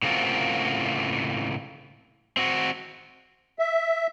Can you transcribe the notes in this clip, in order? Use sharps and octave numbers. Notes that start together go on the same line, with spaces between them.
A2 C#3 A#3 C4 F4 F#4
C4 F#4
E5